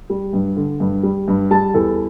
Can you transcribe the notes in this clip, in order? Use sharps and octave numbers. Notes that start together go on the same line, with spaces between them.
G3
G2
D3
G2
G3
G2
G3 A5
E2 A4